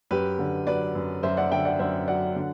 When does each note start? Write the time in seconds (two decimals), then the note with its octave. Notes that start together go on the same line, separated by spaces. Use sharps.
0.11 F#2 G4 B4
0.39 D3
0.67 F#3 B4 D5
0.95 F#2
1.23 F#2 C5 E5
1.37 D5 F#5
1.51 D3 E5 G5
1.65 D5 F#5
1.79 F#2 C5 E5
2.07 F#3 D5 F#5
2.36 D3